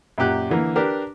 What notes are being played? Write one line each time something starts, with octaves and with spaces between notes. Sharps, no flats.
F#2 A#2 G4 F#6
D3 E3 A#3
D4 G4 A#4 B4